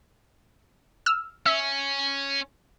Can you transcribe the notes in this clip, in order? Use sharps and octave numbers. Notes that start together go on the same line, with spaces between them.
E6 F6
C#4 E5